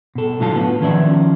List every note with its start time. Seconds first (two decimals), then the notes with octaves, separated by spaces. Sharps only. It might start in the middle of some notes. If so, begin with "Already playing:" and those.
0.15 B2 A4
0.40 A2 D3 F#3 F4 A5
0.56 B3
0.81 D#3 F3 C#4 A#4 D5 E5